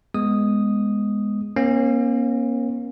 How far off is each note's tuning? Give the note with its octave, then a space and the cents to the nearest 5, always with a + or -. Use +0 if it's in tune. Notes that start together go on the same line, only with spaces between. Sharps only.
G#3 +0 B3 +0 D#6 +0
A#3 +30 C#4 -35